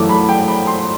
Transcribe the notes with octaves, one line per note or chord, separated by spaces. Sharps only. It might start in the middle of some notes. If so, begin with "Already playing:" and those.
Already playing: F#2 E3 A3 D6
B5
G5
B5
C6